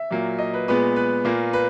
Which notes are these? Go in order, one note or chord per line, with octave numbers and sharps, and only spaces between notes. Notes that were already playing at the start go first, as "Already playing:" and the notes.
Already playing: E5
A#2 F#3 A#3
D#5
B4
A#2 G#3 B3 B4
B4
A#2 A#3
B4